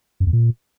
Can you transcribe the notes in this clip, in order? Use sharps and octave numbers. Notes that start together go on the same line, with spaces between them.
F#2
E2
A#2